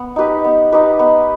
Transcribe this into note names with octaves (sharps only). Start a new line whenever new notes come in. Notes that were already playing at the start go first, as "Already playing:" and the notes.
Already playing: B3
D#4 G4 B4
B3
D#4 G4 B4
B3